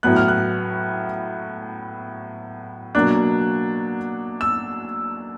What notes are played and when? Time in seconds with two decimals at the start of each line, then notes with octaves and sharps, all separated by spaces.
0.03 A2 F#3 B3 F#6
0.16 F6
0.28 F#6
2.95 B2 F#3 A#3 D4 F#6
4.41 E6